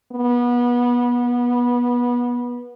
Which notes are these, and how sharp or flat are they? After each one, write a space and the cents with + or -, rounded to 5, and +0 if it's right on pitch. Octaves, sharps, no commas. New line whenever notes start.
B3 -25